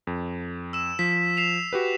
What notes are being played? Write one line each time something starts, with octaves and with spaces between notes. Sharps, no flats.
F2
E6 E7
F3 B6
C7 E7 F7
F#4 G4 B4